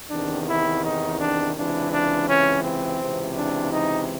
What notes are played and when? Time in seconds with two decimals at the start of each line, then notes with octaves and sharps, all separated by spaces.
0.11 E2 C3 D#3 D4
0.48 E4
0.84 D#4
1.19 D4
1.56 C#2 C3 E3 D4
1.92 D4
2.29 C#4
2.64 C4
3.01 C#2 C3 E3
3.37 D4
3.73 D#4